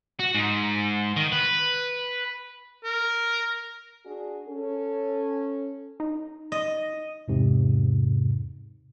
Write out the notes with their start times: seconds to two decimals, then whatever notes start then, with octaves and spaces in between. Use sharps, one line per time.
0.20 F#4
0.35 G#2
1.16 D#3
1.32 B4
2.84 A#4
4.05 D4 F#4 G#4
4.48 C#4 A4
6.00 D#4
6.52 D#5
7.28 E2 G#2 C3